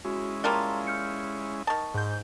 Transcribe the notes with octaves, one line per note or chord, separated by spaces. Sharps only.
G#3 C#4 E4 F#4
G3 A#3 F4 A5 A#5 C6
F6 G6 C#7
D#3 A5 C#6 D#6
G#2 G6